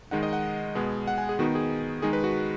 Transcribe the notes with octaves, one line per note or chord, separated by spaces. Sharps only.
D#3 G#3 D#4 F#5
D#5
F#5
B2 G#3 B3
F#5
G#5
G#4
D#3 B3 D#4 F#4
G#4
D#3 G#3 D#4 G#4
B4
F#4